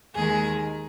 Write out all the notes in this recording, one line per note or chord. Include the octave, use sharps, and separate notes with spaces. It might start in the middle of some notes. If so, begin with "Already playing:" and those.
D#2 D#3 G#3 G#4